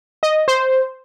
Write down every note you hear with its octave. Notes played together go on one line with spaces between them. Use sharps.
D#5
C5